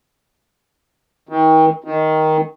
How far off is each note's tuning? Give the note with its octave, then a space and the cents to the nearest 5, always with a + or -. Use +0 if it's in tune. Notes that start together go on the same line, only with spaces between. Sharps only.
D#3 +35
D#3 +10